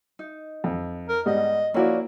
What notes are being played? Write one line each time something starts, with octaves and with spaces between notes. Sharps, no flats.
D#4
F2
A#4
G#2 G3 B3 D#5
F3 A#3 C#4 E4 F#4 D5